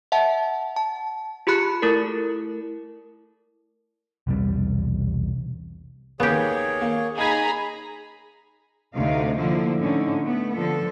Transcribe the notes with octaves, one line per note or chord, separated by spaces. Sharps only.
E5 F#5 A5
A5
F4 G4 G#4 B5 F#6 C#7
A3 E4 A4 A#4
B1 E2 C3 G3
D#2 A#3 B3 G4 G#4 C#5
A#3
D#4 G#4 A#5 B5 G#6
D2 C3 D#4 F5
D3 F3 A#3 E4
A2 D3 A3 C#4 D#4
A3 B3
D3 F3 A4